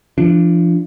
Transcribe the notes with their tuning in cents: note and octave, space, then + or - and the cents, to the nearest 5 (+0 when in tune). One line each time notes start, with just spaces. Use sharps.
F3 -30 D4 +0